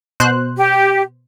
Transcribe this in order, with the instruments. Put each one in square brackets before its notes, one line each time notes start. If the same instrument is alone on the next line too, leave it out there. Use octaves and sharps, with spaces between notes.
[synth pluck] B2 C5 F#6
[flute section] G4